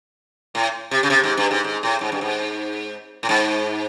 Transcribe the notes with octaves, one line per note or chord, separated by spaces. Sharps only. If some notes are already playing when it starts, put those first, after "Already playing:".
A2
C3
C#3
C3
G#2
G2
G#2
G#2
A2
G#2
G2
G#2
A2
G#2